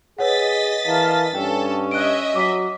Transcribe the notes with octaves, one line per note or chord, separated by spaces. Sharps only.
G#4 B4 C#5 D#5 F#5 A6 B6
E3 A#4 F5 A5
G2 C#4 A4 G5
D#5 E5 F#6 D7
F#3 D6 B6